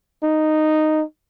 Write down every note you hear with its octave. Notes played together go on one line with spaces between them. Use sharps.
D#4